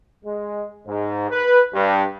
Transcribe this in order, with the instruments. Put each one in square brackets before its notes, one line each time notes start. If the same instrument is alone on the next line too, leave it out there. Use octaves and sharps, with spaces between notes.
[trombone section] G#3
G#2
B4
G2